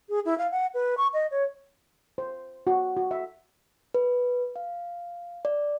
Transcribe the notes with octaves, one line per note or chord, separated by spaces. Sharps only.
G#4
E4
F5
F#5
B4
C#6
D#5
C#5
C5
F#4
F#4
E5
B4
F5
D5